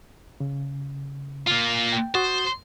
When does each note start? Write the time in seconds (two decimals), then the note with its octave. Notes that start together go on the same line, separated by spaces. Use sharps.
0.40 C#3
1.48 A#3 F4
1.93 G5
2.15 F#4 C5 D#6 A6